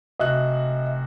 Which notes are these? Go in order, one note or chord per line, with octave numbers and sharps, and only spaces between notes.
F1 F#4 D#5 E5 F#6